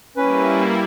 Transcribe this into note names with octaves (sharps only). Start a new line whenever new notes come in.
G3 A#3 C#4 E4 B4